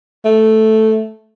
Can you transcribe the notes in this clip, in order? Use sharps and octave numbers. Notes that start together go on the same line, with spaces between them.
A3